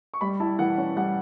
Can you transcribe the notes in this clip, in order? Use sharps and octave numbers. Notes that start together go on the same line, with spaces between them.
C#6
G3 B5
E4 A5
E3 F#5
C#4
G3 F#5